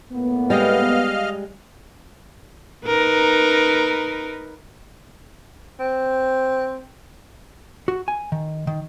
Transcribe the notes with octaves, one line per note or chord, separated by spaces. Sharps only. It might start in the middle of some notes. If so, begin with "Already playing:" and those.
A2 A#3 B3
G3 G#3 D#5 F5 F6
D#4 A#4 B4
C4
F#4
G#5
D#3
D#3